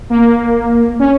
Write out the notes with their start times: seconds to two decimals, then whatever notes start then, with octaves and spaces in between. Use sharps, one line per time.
0.10 A#3
0.99 C#4